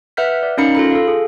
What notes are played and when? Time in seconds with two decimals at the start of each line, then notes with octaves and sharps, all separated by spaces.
0.17 B4 E5 F#5 F6 G6 B6
0.43 D5
0.58 C#4 D#4 A#4 F5 B5 C#7
0.75 F4 A4 B5
0.91 A4 F5
1.08 G#4